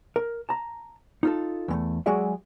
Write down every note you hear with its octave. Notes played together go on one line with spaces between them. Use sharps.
A#4
A5 A#5
D#4 F4 A4
E2 G#3 A3
F#3 G#3 F#4 G#4 D5 E5